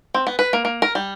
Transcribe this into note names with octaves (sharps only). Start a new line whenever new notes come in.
C4
B3
B4
A#3
A#3
A#4
G3